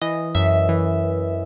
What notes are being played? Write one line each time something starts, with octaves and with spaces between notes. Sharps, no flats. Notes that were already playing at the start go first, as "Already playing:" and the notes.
E3 D#5
F#2 E5
E3